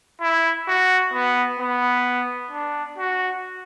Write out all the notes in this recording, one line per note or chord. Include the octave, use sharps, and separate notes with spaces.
E4
F#4
B3
B3
D4
F#4